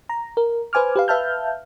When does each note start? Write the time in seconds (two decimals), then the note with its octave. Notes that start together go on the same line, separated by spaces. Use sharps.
0.09 A#5
0.37 A#4
0.73 B4 C5 G#5 D6 F6
0.96 G4 B4 F5
1.08 B4 E5 F5 A5 F6 G6